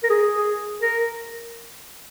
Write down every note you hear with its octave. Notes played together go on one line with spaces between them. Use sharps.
A#4
G#4
G#4
A#4